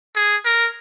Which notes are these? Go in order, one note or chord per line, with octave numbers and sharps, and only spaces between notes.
G#4
A#4